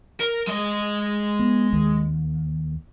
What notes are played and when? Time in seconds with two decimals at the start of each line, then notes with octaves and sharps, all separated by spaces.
0.20 A#4
0.47 G#3 D#5
1.39 B3
1.73 D#2